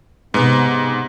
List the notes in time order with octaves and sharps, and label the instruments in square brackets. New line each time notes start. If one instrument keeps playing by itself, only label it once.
[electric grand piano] G#2 B3 [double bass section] C3